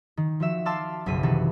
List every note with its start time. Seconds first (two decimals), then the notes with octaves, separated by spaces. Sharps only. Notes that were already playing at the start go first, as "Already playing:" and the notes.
0.17 D#3
0.40 F3 F#4 E5 E6
0.65 F5 A5 C6 D6 E6 F6
1.06 F#1 B1 B6 D#7
1.23 C3 D#3 E3 F#4 A4 B4